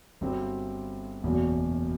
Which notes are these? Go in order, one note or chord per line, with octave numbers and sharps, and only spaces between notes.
G1 G2 F#3 C4
F#1 E2 B2 F#3